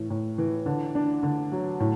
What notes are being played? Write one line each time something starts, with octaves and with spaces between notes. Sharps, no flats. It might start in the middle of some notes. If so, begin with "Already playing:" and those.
Already playing: A2 E3
A2
E3
D3
D4
D3
F#3
A2